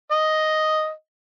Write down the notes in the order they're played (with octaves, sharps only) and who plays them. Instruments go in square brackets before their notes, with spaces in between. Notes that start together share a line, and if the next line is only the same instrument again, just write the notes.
[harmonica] D#5